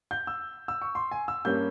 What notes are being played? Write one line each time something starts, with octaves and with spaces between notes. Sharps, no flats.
G6
E6
E6
C#6
C6
G#5
E6
G2 G3 A#3 C#4 G6